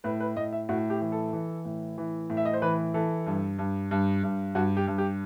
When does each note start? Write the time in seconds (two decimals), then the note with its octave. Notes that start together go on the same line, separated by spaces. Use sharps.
0.04 A2 B4
0.20 B4
0.37 A2 D#5
0.53 E5
0.69 A2 F#4
0.90 G4
1.01 E3
1.12 A4
1.33 E3
1.65 A2
1.98 E3
2.30 A2
2.37 E5
2.45 D#5
2.53 C5
2.62 E3 B4
2.94 E3 A4
3.27 G2
3.59 G2
3.91 G2
4.24 G2
4.55 G2 F#4
4.77 G4
4.87 G2
4.98 G4